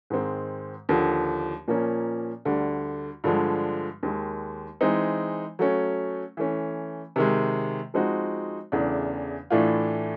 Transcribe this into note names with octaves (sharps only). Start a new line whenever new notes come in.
G#2 D#3 G#3 C4
D#2 D3 F3
A#2 F3 A#3 C#4
D2 D3 G3
G2 D3 F3 G#3
D#2 D#3 G#3
E3 G#3 C4 D#4
F#3 A3 C#4
E3 A3 C#4
C3 D#3 G#3
F3 G#3 C4 D#4 F#4
E2 C#3 E3 A3 D4
A2 E3 A3 D4 F4